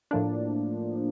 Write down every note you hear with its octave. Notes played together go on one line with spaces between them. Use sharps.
A2 F3 A#3 D4